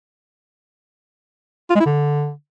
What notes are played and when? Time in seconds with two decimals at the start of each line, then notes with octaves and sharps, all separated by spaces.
1.70 F4
1.75 G#3
1.80 E4
1.86 D3